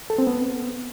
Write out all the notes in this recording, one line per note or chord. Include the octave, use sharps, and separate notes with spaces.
A4
C4
B3